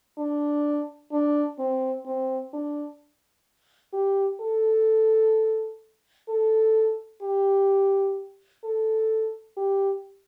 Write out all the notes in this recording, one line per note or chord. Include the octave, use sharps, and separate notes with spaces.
D4
D4
C4
C4
D4
G4
A4
A4
G4
A4
G4